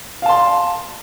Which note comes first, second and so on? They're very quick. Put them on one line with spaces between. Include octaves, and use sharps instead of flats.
F5 A5 C6